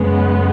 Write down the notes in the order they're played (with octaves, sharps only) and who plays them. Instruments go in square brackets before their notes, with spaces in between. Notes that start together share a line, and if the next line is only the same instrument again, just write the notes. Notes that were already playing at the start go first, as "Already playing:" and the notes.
Already playing: [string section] F#2 C#3 G#3 B3